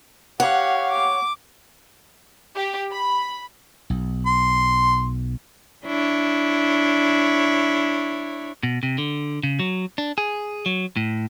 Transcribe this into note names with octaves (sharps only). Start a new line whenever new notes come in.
G4 C#5 F5 F#5
D6
G4
B5
B1
C6
D4 E4 C#5
B2
C3
D3
C#3
F#3
D4
G#4
F#3
A2